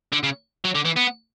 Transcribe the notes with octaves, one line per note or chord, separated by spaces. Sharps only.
D3
C#3
F#3
D3
E3
B3